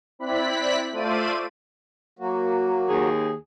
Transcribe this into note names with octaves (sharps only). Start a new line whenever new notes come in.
C4 E4 D5 B5 F#6 B6
A3 F4 C5 D5 E5 D#7
F#3 A#3 F#4
D#2 G#4